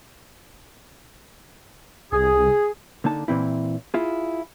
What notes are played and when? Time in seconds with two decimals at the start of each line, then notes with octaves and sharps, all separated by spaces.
2.12 C2 G#4
3.04 D3 A#3 D#4 A5
3.28 A#2 E3 C4 E4
3.94 E4 F4 G#4